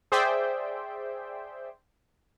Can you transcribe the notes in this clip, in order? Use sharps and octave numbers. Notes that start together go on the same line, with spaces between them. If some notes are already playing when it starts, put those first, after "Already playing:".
G#4 C5 D5 E5 G5